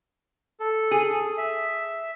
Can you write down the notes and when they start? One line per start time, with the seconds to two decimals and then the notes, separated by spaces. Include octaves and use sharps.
0.60 A4
0.91 G#4
1.38 E5